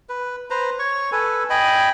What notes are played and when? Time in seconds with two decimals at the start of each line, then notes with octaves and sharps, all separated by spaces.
0.09 B4
0.50 B4 C5 A#5
0.79 C#5 C#6
1.12 A4 B4 G#5
1.50 D#5 G5 G#5 B5